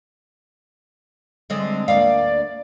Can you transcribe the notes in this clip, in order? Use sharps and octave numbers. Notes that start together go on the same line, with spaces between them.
D3 G#3 C4
D2 A#3 D5 F5